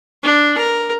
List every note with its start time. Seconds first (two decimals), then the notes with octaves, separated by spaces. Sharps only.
0.23 D4
0.58 A#4